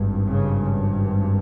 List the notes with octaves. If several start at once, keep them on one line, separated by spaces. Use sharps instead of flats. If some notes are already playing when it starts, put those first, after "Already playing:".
Already playing: G#1 G2
C#3